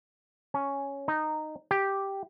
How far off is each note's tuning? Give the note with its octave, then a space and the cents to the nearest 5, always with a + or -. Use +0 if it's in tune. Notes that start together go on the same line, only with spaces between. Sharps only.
C#4 +5
D#4 -10
G4 +0